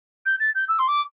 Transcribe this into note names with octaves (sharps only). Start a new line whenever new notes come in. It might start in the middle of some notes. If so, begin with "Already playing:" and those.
G6
A6
G6
E6
C6
D6